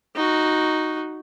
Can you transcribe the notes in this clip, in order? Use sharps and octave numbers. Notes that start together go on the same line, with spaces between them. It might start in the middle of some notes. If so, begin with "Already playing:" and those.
D#4 F#4